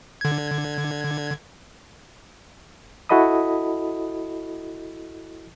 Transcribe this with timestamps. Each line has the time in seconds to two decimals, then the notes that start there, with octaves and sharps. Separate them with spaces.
0.21 D3 G#6
3.09 E4 F#4 A4 D#5 B5 D#6